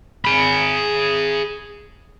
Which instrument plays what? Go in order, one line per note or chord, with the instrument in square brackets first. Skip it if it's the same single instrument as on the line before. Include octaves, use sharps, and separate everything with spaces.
[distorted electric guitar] G#4 B5